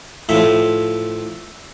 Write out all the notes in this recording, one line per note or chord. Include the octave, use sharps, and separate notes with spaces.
A2 F3 E5